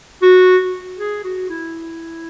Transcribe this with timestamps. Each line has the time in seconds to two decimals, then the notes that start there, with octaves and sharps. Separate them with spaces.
0.22 F#4
0.98 G#4
1.24 F#4
1.49 E4